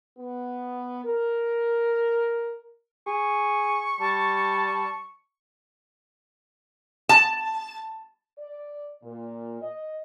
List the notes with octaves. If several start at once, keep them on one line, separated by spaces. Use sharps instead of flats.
B3
A#4
G#4 C#6
G3 A5
A5
D5
A#2
D#5